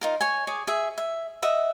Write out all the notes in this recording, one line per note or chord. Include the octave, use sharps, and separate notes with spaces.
D#4 F4 A#4
C#5 G#5
G#4 C#5 D6
G#4 E5
E5
D#5 E5 F#5